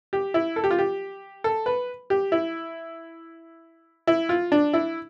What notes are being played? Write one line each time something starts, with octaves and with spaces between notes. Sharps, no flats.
G4
E4
A4
G4
F4
G4
A4
B4
G4
E4
E4
F4
D4
E4